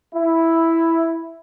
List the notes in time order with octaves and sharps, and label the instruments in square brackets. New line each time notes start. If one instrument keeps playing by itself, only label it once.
[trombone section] E4